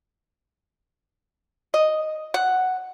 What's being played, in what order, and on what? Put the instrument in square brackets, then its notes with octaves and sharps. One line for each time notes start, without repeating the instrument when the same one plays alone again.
[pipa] D#5
F#5